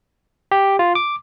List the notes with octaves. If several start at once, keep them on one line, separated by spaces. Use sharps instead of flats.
G4
F4
D6